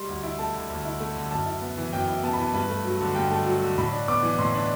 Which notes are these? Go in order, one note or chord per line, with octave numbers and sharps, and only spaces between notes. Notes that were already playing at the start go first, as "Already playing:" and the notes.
Already playing: G3 C6
D2
E4
A3 A5
D3
D2
E4
A3
D3
F#2 A5
E4
B3
E3
F#2 G5
E4
B3 A5
B5
E3
A5
G2 B4
A3
F#3
D3
G2 G5
A3 A5
F#3
D3
A2 B5
D4
B3 D6
E3
A2 C6
D4